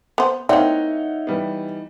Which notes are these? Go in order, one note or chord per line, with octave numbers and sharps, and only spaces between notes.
B3 C5
A#3 C4 D#4 C#5 E5 F#5
E3 G3 B3